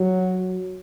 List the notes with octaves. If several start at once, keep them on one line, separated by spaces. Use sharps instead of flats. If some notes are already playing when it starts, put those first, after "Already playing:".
Already playing: F#3